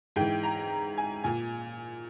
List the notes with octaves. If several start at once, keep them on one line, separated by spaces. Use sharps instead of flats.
G#2 E3 G5
A#5
G#5
A#2 G#5